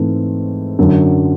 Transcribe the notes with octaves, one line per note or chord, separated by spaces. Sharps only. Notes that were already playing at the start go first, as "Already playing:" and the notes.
Already playing: G#2 E3 A3 C4 E4
F#2 D3 F#3